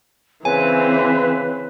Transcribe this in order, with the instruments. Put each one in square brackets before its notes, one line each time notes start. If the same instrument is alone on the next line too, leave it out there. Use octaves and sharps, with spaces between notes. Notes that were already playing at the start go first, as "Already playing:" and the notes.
[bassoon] C#3 [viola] E3 C4 [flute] B4 [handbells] G#5